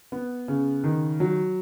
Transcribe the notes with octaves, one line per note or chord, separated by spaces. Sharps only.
B3
C#3
D#3
F#3